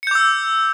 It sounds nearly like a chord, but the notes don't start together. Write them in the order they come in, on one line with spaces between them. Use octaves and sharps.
C#7 G6 D6 E6